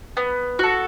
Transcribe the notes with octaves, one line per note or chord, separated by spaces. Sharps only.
B3
F#4 A4